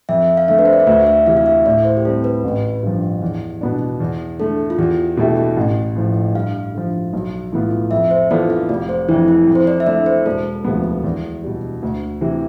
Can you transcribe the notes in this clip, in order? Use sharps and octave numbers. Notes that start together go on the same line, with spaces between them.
F2 E5
F5
D3 A3 E5
B4
C5
D5
E5
D2 F5
E5
C3 E3 F5
F5
E5
A2 D5
C5
G4
G3 C4 A4
B4
A1
G2 F3
E2
B2 B3 D4
E2
D3 A3 A4
F4
E2 G4
B2 A3 E4 G4
A1
A2 F3
G2 F5
D3 F3
B1
A2 E3 B3 F4
F2 E5
C5
E3 B3 F4 A4 D5
F5
F1 D5
C5
F2 E3 E4
E4
F2
C5
D5
E5
D3 A3 E4 D5
C5
E1 A4
D2 C3 F3 B3
E2
B2 G3
D2
C3 E3